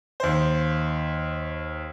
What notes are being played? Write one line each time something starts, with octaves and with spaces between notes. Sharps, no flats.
D#2 C5